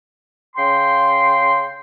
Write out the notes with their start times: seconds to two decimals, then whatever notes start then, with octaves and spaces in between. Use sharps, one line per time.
0.57 C#3 G5 C6